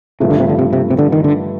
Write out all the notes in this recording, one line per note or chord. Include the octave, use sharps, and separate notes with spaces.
G2 C3 F3 A3
D3
C3
D3
C3
C3
C3
D3
D#3
D3